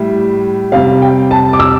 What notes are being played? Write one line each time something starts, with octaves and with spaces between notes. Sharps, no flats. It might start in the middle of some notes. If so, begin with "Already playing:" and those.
Already playing: A2 G3 E5
C3 G3 F5
G5
A5
D6
E6